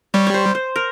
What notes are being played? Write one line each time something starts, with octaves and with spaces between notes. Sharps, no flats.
G3 C#5
C#5
C5
C5
A#4